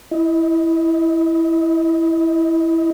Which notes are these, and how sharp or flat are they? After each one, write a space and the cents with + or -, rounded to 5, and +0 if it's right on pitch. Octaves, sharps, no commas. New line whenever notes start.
E4 +0 D#5 +25